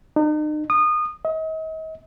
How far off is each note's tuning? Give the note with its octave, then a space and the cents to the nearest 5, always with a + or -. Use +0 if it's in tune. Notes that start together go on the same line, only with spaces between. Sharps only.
D#4 -40
D#6 -25
D#5 +40